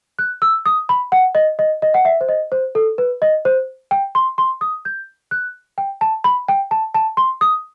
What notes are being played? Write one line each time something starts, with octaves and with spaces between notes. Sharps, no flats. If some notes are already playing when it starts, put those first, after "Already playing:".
F#6
E6
D#6
B5
F#5
D#5
D#5
D#5
F#5
E5
C5
D#5
C5
A4
B4
D#5
C5
G5
C6
C6
D#6
G6
F#6
G5
A5
B5
G5
A5
A5
C6
D#6